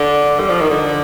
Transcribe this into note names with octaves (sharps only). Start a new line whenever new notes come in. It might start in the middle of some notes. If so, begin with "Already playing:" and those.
Already playing: D3
G3
F3
D#3
D3